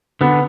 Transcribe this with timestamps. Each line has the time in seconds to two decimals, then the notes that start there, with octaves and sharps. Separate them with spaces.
0.21 D3 B3